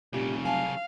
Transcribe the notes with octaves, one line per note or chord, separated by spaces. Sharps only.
F1 C2 A#2 C#3 G4 D#5
F#3 F5 G#5 A5